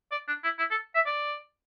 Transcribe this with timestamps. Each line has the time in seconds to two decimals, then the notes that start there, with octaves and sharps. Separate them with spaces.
0.12 D5
0.28 D4
0.44 E4
0.59 E4
0.71 A4
0.95 E5
1.06 D5